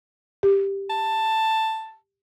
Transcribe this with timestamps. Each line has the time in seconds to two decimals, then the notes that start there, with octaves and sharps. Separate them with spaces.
0.43 G4
0.90 A5